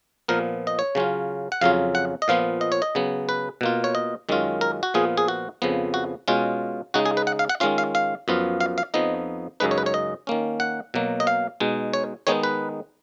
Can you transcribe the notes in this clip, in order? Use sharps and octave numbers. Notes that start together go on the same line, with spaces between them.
A#2 F3 B3 A#4
D#5
C#5
C#3 F#3 C#4 F4
F#5
F2 C#3 F#3 C#4 F4 F5
F#5
D#5
A#2 F3 B3 F4 F5
D#5
C#5
D#5
C#3 F#3 B3
B4
B2 A#3 F4
C#5
D#5
F#2 D#3 G#3 C#4 F4
A#4
F#4
A#2 F3 B3 F4 G#4
G#4
F#4
F2 C#3 F3 B3
F#4
B2 G#3 C#4 F4
C#3 G#3 D#4 F#4
G#4
B4
F#5
F5
F#5
D#3 G#3 C#4 F4 F5
F5
F5
F#2 F3 B3 F4
F5
F5
F2 F3 B3 D#4 D#5
F#2 C#3 G#3 D#4 B4
C#5
B4
C#5
D#5
D#3 A#3 C#4
F#5
B2 F#3 A#3
D#5
F5
B2 G#3 D#4
C#5
D#3 G#3 B3 D#4 C#5
B4